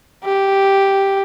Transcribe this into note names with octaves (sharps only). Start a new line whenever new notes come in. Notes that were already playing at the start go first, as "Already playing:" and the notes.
G4